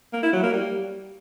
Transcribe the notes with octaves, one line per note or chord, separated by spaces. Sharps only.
A#3
E4
F#3
A#3
G3